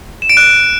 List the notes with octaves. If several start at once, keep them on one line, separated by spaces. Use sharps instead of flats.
E7
D7
F#6